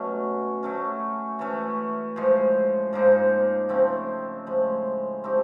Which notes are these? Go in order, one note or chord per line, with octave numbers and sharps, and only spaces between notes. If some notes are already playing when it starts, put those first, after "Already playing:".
Already playing: B2 F#3 A3 C#4
F#3 A3 C#4
E3 A3 C#4
A2 F3 G#3
G#2 F3 A#3 D#4
C#3 F3 A3 C4
A2 F3 G#3
A3 C4 D#4 G4